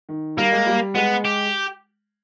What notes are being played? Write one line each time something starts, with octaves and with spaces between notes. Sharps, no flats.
D#3
G3 A#3
G#3
G3
G#3 B3
G4